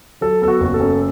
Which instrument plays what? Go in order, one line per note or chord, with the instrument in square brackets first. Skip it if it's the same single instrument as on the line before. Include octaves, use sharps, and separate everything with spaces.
[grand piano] F#3 A4
B3 A4
F#4
F#1 F#4
A4
F#2